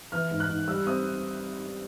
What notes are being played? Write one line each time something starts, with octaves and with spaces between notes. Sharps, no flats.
E3 F6
G#2
F#6
G#2
G3 E6
C4 D#6